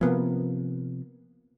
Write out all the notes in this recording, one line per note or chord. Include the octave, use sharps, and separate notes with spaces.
C3 F3 A#3 B3